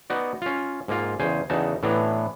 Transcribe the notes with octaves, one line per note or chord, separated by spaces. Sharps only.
B3 D#4 F#4 D5
C#4 F4
G#2 A#3 F4
E2 C#3 C5 G#5
E2 C#3 D#4 F#4 A5
A2 E3 B3 D4 A#5